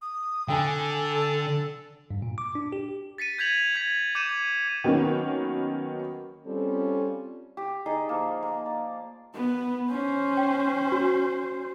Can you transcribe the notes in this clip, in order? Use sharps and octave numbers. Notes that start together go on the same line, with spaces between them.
D#6
D3 A4 G5 G#5
G2
A#2
D6
D4
G4
A6 B6 C#7 D#7
G6 G#6 B6 F7 F#7
G6 G#6 B6
D6 G6 C#7 D#7 E7
D#3 F#3 A#3 B3 C#4
G3 C4 C#4 F4 A4
G4
D#4 G#4 D5 D#5
F3 A#3
A#3
D5
B3
C#4 C5
G5
F#4